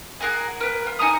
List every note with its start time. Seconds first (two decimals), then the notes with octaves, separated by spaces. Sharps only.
0.21 G#4 A#4 F#5 G#5
0.61 A#4 B4
0.87 F4
0.99 D#4 G#5 A#5 D#6